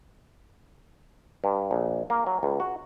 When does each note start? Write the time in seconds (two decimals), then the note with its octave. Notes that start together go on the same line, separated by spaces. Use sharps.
1.44 G2
1.71 A#1
2.10 A#3
2.27 F#3
2.43 C#2
2.60 F#4